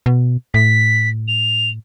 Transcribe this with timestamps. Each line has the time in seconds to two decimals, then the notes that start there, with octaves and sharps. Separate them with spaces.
0.06 B2
0.54 A2 B6
1.28 F7